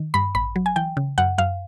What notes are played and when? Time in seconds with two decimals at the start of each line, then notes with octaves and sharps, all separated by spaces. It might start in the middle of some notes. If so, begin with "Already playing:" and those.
Already playing: D#3
0.14 G2 B5
0.35 A1 B5
0.56 F#3
0.66 G#5
0.76 E3 G5
0.97 C#3
1.18 F#2 F#5
1.38 F#2 F5